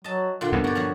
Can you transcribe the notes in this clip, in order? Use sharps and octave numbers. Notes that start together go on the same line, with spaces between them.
F#3 D#5 A5
A#2 D3 F4 G5
C2 G#2 B3
G2 F#4 D5
F3 F#3 F#4